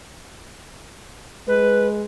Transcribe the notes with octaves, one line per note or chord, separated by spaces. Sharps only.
G#3 B4